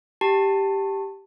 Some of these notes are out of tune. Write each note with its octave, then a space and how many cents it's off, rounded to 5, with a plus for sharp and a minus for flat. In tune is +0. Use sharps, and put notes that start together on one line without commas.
G4 +0 A5 +15